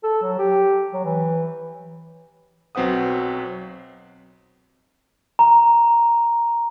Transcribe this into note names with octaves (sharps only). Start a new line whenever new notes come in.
A4
F#3
G4
F#3
E3
B1 F#3 C4 B4 F#5 D#6
A#5